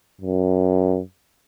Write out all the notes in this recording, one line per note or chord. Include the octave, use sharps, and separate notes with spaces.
F#2